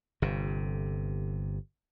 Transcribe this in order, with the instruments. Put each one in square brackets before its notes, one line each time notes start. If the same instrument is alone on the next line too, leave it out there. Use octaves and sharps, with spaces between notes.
[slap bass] G1 C3